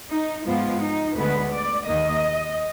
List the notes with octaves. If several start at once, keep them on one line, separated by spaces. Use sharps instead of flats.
D#4
G#2 F3 G#3 B3 F4
D#4
D2 D3 G#3 B3 B4
D5
D#2 D#3 A#3 D#5